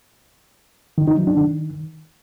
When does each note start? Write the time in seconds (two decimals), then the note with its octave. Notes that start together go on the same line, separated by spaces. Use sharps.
0.98 D#3
1.08 D#4
1.17 F#3
1.27 D4
1.37 D#3